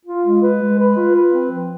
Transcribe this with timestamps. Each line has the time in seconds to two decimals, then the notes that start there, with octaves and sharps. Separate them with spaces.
0.05 F4
0.24 G#3
0.43 B4
0.61 G#3
0.79 B4
0.97 F4
1.16 B4
1.33 C4
1.52 F3